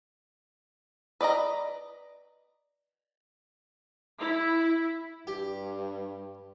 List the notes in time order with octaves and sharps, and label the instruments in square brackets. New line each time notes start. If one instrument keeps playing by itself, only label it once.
[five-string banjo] B4 D5 D#5 A#5
[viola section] E4
[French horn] G2 [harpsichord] G4